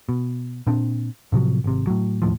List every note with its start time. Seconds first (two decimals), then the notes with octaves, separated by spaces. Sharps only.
0.09 B2
0.67 A#2 C4 D4
1.32 A2 C3 F3 F#3
1.64 G#1 C3
1.87 A2 F#3
2.22 E1 D#2 A2 F3